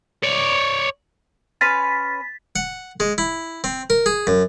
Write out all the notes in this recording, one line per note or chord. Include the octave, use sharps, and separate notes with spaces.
C#5 D5
C#4 B4 C6 A6 B6
F#5
G#3
E4
C4
A#4
G#4
F#2